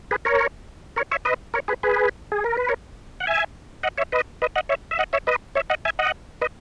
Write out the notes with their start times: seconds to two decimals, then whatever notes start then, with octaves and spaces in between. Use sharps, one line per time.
0.11 G#4 B4
0.25 A#4 C#5
0.96 A#4 C#5
1.11 C#5 E5
1.25 B4 D#5
1.54 A#4 C#5
1.68 G#4 B4
1.83 G#4 B4
2.32 G#4
2.44 A#4
2.57 B4
2.68 A#4 C#5
3.20 F#5
3.27 E5 G#5
3.83 D#5 F#5
3.98 C#5 E5
4.12 B4 D#5
4.42 B4 D#5
4.56 D#5 F#5
4.69 C#5 E5
4.91 E5
4.99 D#5 F#5
5.13 C#5 E5
5.27 B4 D#5
5.55 C#5 E5
5.70 D#5 F#5
5.85 E5 G#5
5.99 D#5 F#5
6.41 B4 D#5